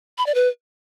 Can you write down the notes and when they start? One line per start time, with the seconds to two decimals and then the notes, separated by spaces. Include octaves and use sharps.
0.18 B5
0.26 D5
0.35 B4